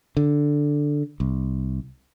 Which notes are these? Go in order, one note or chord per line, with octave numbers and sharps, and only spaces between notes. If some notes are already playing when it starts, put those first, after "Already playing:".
D3
C2